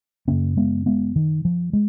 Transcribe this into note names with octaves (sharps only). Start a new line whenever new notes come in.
F#2 C#3 A#3 C#4
G#3 B3
G#3 B3
D#3
F3
G#3